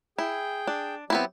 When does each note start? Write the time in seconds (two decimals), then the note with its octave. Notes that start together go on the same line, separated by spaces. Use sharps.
0.18 E4 G#4 G5
0.67 D4
1.10 F#3 B3 C4 E4 G4